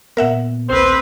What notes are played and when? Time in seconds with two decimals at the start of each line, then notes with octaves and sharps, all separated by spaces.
0.17 A#2 B3 A#4 E5 F#5
0.69 A#1 D#2 C4 B4 C5